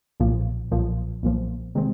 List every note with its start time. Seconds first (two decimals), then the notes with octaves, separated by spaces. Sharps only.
0.20 B1 A#2 F3
0.71 B1 A#2 F3
1.23 B1 A#2 F3
1.75 C3 D#3 G#3 C4